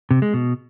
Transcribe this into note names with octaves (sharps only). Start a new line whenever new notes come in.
C3
G#3
B2